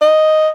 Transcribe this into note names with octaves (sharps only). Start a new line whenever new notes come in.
D#5